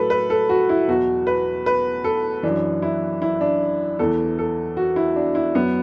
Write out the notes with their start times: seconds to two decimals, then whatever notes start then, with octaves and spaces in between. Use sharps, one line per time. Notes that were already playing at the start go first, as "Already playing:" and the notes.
Already playing: A2 F#3 A4 B4
0.10 B4
0.30 A4
0.49 F#4
0.69 E4
0.88 E2 B2 F#3 F#4
1.27 B4
1.66 B4
2.04 A4
2.43 F#2 E3 D4
2.82 E4
3.22 E4
3.41 D4
3.99 E2 E3 A4
4.39 A4
4.77 F#4
4.96 E4
5.16 D4
5.35 E4
5.55 F#2 F#3 B3